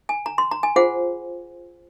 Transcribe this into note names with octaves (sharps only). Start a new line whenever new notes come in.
G#5
A#5
C6
A#5
G#5
F4 G#4 C5 F#5